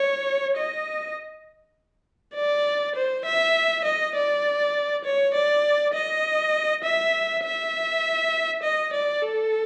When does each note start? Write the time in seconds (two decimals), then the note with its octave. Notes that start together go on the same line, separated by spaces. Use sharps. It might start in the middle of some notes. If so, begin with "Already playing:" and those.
Already playing: C#5
0.56 D#5
2.35 D5
2.96 C5
3.25 E5
3.84 D#5
4.15 D5
5.04 C#5
5.34 D5
5.93 D#5
6.83 E5
7.44 E5
8.63 D#5
8.93 D5
9.22 A4